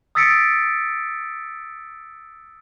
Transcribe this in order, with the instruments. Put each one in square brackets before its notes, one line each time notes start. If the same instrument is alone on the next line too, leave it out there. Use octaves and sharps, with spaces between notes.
[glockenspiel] D#6 E6 A6 B6 C#7 D7